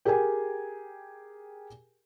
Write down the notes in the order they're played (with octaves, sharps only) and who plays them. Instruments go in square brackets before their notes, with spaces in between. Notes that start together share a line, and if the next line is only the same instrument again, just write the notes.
[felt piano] G4 G#4 A#4 G5 G#5